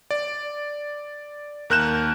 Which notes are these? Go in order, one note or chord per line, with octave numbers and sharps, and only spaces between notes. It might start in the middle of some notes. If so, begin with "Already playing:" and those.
D5
D#2 A#4 F#6 G6 E7